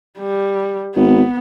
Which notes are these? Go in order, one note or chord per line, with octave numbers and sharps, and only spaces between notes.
G3
G#1 B3